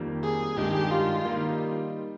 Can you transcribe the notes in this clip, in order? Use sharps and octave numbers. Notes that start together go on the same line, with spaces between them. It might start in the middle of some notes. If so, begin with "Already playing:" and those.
Already playing: F2 D#3 G3 A#3
G#4
G2 D#3 G#3 D#4 G4
F4
D#3 G3 A#3 D#4